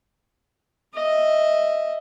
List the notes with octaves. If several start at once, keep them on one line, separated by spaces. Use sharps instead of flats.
D#5 E5